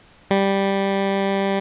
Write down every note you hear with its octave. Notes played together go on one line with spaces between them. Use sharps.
G3